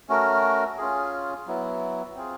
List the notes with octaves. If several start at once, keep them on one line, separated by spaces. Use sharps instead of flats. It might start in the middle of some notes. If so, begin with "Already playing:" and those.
A3 C#4 F#4 A#4
C#4 F4 G#4
F#3 B3 E4
C4 F4 G#4